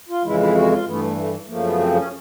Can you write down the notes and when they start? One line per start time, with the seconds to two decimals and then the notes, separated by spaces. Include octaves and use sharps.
0.09 F4
0.24 F2 C#3 E3 G#3 E4
0.40 E4
0.55 F#4
0.71 F4
0.86 G2 E3 A3 B3
1.17 A3
1.48 F#2 C#3 F3 A3 A#3
1.64 B3
1.79 C4
1.95 C#4